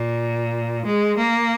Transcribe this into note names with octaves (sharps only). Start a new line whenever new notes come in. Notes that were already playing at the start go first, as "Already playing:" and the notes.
Already playing: A#2
G#3
A#3